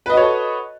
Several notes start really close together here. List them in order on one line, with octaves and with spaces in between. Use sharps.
B4 D#5 F#4 C#5 A4